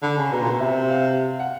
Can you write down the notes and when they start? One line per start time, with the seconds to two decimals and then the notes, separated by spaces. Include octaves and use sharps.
0.02 D3 B5
0.18 C#3
0.32 B2 A#5
0.42 A#2
0.51 B2
0.60 C3 E5
0.90 F5
1.39 F#5